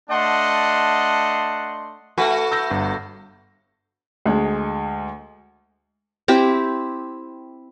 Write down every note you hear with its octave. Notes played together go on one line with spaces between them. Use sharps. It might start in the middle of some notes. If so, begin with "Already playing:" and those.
A3 D4 D#5 F#5 A5 C6
A3 F#4 B4 G#5
E6 G6 A#6
G1
D2 G#3
C4 E4 G4